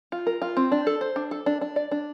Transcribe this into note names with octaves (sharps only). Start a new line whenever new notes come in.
F4
A#4
F4
C4
D4
A4
C5
D4
A4
D4
D4
D5
D4